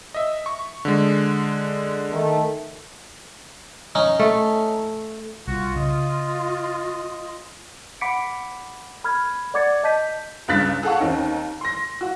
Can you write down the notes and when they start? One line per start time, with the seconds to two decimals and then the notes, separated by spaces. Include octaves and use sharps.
0.14 D#5 E5
0.46 C#6
0.85 D3 G#3
2.13 D#3 A3
3.95 C#4 D#4
4.19 A3
5.47 C2 F4 F#4
5.76 C#3 D#5
8.01 F#5 B5 D6 B6 C#7 D7
9.04 B5 F6 G#6
9.54 D5 F#5 D6 G#6 A6 C#7
9.83 D#5 A5 G6 B6 D#7
10.48 C#2 G2 C#3 F#6 A6 B6
10.83 G#4 A4 F5 F#5 C#6
10.99 D#2 D#3 C4 C#4
11.61 C6 A#6
12.01 F#4